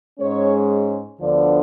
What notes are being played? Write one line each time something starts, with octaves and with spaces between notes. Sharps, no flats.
G#2 G#3 C#4 C#5
D2 D3 F3 B3 D4 D5